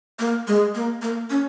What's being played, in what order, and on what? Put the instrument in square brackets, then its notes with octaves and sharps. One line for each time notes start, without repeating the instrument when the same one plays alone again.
[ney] A#3
G#3
A#3
A#3
C#4